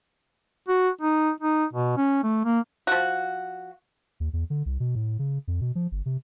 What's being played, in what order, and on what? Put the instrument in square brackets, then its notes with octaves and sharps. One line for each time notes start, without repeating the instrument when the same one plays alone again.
[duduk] F#4
D#4
D#4
B2
C#4
A3
A#3
[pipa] F3 F#4
[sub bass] D#2
E2
D3
C2
B2
A2
C#3
F2
B2
F3
G1
C3